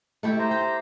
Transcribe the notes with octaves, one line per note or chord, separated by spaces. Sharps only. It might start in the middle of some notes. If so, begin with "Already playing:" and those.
A3 E4 G4
C5 A#5
G4